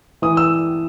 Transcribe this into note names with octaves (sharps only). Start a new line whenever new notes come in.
E3 D#6
E6